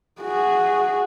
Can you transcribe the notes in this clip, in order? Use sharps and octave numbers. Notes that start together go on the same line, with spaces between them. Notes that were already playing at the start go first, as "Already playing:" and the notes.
F#4 G#4